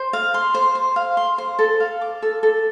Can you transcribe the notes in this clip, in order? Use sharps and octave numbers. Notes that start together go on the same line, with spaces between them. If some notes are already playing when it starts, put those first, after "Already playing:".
Already playing: C5
F5
C6
C5
C5
F5
C6
C5
A4
F5
D6
A4
A4